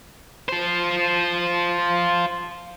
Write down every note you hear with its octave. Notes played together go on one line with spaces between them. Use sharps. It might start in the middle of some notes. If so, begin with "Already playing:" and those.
F4 C5